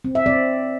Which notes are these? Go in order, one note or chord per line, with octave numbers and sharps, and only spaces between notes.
C4
E5
C4 D5